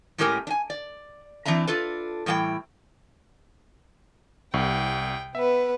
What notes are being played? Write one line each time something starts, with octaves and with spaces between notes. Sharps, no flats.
A2 G#3 C#4 G4 A#4 G#5
D4 G#5
D5
E3 C4 D4 E5 A#5
D4 F4 A4 B4
A2 E3 G3 F#5 G5
C2 G5
B3 B4 E5